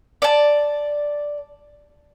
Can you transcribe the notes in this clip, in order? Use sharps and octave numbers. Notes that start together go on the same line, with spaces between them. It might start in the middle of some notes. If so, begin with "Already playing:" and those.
D5 A5